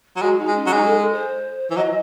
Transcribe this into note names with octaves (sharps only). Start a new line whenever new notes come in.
F#3
G#3 F#4
D#4
G#3
C#4
F#3
G#3 D#4
A4
A4
C5
E3
F#3 D#5